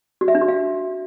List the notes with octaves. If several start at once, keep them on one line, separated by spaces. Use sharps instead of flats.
F#4
E5
D4
F#4
F5